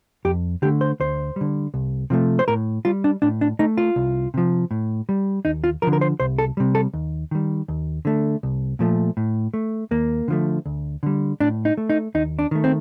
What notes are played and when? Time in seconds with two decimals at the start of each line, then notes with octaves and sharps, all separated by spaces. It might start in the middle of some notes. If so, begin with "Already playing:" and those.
0.25 F2 G4
0.62 D3 A3 G4
0.81 C5
1.00 D2 C5
1.36 D3 G3
1.74 C2
2.10 C3 F3 A3
2.39 C5
2.48 A2 A#4
2.85 G3 F4
3.04 D4
3.22 A2 D4
3.41 D4
3.59 A3 D#4
3.77 F4
3.96 C2
4.34 C3 F3
4.71 A2
5.09 G3
5.45 D#2 D#4
5.64 F4
5.82 D3 F3 A#4
5.93 A#4
6.01 C5
6.20 C2 C5
6.38 A4
6.57 C3 G3
6.75 A4
6.94 D#2
7.31 D#3 G3
7.68 D#2
8.05 D3 A3
8.43 C2
8.79 A#2 F3 A3
9.17 A2
9.54 A3
9.91 D#2 A#3
10.28 D3 F3 A3
10.66 D2
11.03 D3 G3
11.40 A2 D4
11.65 D#4
11.77 A3
11.90 D#4
12.14 D#2 D#4
12.39 D4
12.51 D#3 A3
12.64 C4